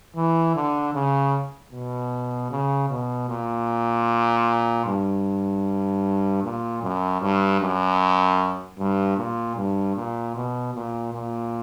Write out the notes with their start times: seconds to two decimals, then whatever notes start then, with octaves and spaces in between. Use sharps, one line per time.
0.16 E3
0.55 D3
0.94 C#3
1.72 B2
2.51 C#3
2.90 B2
3.29 A#2
4.86 G2
6.43 A#2
6.82 F#2
7.22 G2
7.61 F#2
8.79 G2
9.17 A#2
9.56 G2
9.96 A#2
10.36 B2
10.75 A#2
11.13 A#2